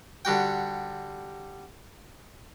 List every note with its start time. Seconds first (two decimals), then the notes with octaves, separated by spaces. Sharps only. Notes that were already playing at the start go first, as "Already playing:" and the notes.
0.25 D3 G3 F#4 G5